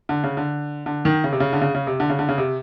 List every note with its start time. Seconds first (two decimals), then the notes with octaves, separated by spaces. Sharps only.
0.09 D3
0.24 C#3
0.37 D3
0.86 D3
1.05 D#3
1.24 C#3
1.33 C3
1.40 C#3
1.53 D3
1.61 C#3
1.75 C#3
1.87 C3
2.00 D3
2.10 C#3
2.19 D3
2.29 C#3
2.38 C3